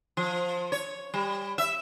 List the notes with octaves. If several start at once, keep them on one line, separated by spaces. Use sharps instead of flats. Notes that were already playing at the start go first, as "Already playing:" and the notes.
F3
C#5
G3
E5